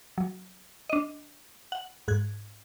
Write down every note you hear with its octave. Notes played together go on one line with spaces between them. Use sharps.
F#3
D4 D#5
F#5
G#2 F#6 G#6